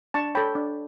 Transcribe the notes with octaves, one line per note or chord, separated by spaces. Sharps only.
D4 A5 C#6
A4 C#5 G5 B5
D4